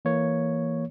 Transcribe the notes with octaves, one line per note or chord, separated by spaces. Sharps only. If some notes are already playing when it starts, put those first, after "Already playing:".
E3 A#3 C#5